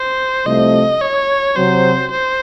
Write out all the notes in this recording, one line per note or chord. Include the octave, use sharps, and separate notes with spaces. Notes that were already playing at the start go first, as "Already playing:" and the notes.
Already playing: C5
C2 C3 F3 A3 D#5
C#5
C3 F#3 C4 C5
C5